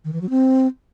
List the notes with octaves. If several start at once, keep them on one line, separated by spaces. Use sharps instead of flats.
D#3
E3
F#3
C4